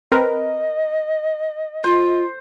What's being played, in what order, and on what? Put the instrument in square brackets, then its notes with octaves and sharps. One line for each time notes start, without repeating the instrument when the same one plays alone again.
[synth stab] C4 A#4 B4 [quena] D#5
[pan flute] F4 [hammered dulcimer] C5